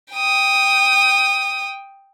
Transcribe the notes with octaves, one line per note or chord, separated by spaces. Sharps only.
G5 D#6